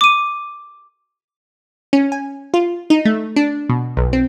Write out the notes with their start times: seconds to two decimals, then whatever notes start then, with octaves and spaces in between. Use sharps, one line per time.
0.01 D6 D#7
1.93 C#4
2.12 G#5
2.54 F4
2.90 D#4
3.05 A3
3.36 D4
3.69 B2
3.97 B1
4.13 C4